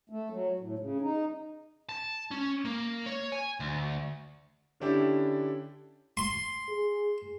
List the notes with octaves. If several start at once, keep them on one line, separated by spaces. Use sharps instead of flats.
A3
F#3
A2
C#3
D#4
A5
C#4
A#3
C#5
G#5
D2
D3 C#4 D4 E4 G4
C6
G#4